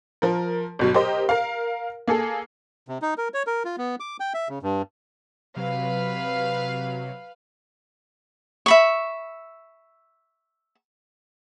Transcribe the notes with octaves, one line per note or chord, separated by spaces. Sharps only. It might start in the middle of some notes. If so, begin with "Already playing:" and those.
F3 A#4
G1 B2 F#3
G4 A#4 C5 D#5
A#4 F5
A#3 G#4 A4
C3
D#4
A#4
C#5
A#4
F4
B3
D6
G5
E5
C#3
G2
C3 F#3 B4 F5
E5 B5 C#6